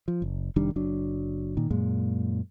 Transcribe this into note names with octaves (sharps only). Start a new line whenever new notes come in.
F3
F#1
F1 D#3 G3 D4
F#1 F#3 D4
A#2 D#3
F#2 A#2 G#3